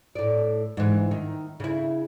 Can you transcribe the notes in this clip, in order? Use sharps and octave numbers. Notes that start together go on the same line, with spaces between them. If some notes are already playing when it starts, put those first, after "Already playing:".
A2 D5
G#2 E3
D#3
C#3 E4